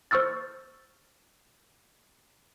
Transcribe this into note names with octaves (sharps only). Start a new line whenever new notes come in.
C5 C#6 E6 F6 A6